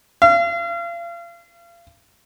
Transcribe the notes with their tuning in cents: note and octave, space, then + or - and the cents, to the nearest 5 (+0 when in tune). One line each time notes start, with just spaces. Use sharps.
F5 -35